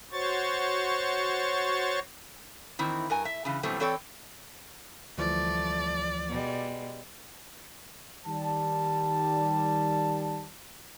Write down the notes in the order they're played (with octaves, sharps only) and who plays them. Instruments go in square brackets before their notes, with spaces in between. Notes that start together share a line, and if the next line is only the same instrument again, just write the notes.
[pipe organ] F#4 C5 C#5 C#6 A6
[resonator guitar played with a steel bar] D#3 E3 C4 D#4 E4
G2 A#4 G#5
E5
C#3 E3
B2 E3 F#3 G3 A3 C4
E3 C4 A4 C#5 D5 G5
[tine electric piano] D2 E3 F3 [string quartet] G3 A3 [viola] D5
[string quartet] B2 G3 G#3
[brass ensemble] D#3 G3 A5